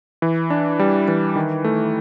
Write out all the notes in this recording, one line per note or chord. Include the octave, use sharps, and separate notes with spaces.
E3
D4
G3
E3
D#3
A3